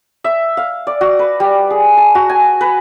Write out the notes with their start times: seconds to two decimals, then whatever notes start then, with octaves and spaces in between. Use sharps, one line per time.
0.24 E5
0.57 F5
0.87 D5
1.01 F#4
1.19 B4
1.40 G3
1.70 G#4
1.97 A5
2.15 F#4
2.29 G#5
2.61 B4